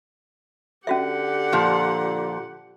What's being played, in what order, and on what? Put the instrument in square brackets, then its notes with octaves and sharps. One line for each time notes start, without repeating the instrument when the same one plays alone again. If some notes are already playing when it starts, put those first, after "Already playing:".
[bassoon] D3 [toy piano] C#4 F#4 E5 [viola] G4 F#5
[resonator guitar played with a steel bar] A#2 F3